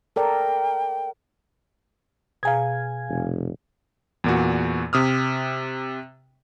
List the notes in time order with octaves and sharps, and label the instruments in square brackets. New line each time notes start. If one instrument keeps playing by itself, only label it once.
[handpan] A4 A#4 D5 [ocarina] G5
[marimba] B2 G#4 A#5 [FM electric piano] F5 G#5 G#6
[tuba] F1
[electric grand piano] E2 A#2 F#4
C3 D#6 F6